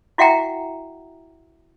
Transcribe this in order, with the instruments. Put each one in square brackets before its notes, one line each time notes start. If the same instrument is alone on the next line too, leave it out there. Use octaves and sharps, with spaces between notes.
[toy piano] E4 F#4 E5 F#5 G5 A#5